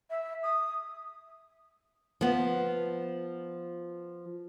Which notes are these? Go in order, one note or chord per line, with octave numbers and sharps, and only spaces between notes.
E5
D#6
F3 B3